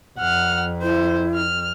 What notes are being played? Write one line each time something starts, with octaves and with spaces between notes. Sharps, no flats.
F2 F#5 F6
E4 C5
F6